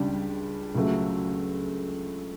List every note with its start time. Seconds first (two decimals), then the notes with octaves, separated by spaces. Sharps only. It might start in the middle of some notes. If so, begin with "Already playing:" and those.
Already playing: C#2 C#3 G3 D4 G4
0.75 C#2 C#3 F#3 A3